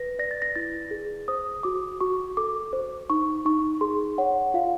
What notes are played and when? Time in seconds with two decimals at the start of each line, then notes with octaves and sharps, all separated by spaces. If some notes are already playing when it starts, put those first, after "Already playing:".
Already playing: B4 A#6
0.19 D5 A#6
0.31 A6
0.42 A#6
0.56 E4 A6
0.91 G#4
1.28 C5 D#6
1.63 F#4 D6
2.01 F#4 C#6
2.37 A4 D6
2.73 C5
3.10 D#4 C#6
3.45 D#4 C#6
3.81 G#4 C6
4.18 C#5 F#5
4.54 F4 F5